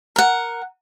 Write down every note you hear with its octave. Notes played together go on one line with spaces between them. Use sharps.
A#4 F#5